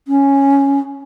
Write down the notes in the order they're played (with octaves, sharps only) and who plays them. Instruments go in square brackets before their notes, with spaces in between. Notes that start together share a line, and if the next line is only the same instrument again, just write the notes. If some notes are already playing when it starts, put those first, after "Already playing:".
[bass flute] C#4